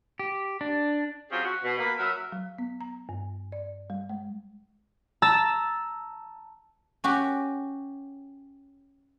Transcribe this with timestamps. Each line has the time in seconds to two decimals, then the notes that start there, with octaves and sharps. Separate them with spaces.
0.19 G4
0.61 D4
1.31 F#3 C4 C#4 F4 G4 G#4
1.44 F#4
1.64 B2
1.79 A#3 B4
1.97 F#3 F#4 A#4 B4 E5
2.32 F#3
2.59 B3
2.81 A#5
3.09 G2
3.52 D5
3.90 G3
4.10 G#3
5.22 A5 A#5 E6 A6
7.04 C#4 F#4 G4